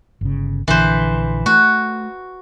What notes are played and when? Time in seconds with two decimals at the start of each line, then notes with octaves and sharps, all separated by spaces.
0.21 G1 C#3
0.68 A#1 D3 E3 C5
1.46 A3 F#4